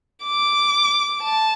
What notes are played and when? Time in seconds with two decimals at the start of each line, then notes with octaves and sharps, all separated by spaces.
0.24 D6
1.22 A5